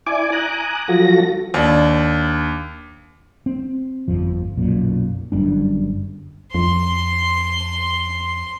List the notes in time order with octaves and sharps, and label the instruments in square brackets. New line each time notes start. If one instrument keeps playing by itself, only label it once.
[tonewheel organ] E4 D5 G#5 D6
G#5 A#5 D6 D#6 F#6
F3 F#3 F4 F#4 A4 A#6
[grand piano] D#2 D4
[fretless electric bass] C4
G1 F2 F3
B1 F#2 A#2
G1 F#2 G3 D4
[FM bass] F2 [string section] C6